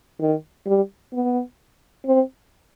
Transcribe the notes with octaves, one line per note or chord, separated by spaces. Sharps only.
D#3
G3
B3
C4